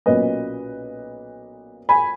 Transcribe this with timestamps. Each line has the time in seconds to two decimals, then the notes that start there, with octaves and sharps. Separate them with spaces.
0.06 B1 A#2 A#3 C#4 B4 D#5
1.89 G#5 B5